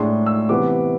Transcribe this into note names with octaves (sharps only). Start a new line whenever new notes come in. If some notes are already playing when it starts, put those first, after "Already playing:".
Already playing: A2 G#3 D4 C6
E6
C3 E3 B3 D6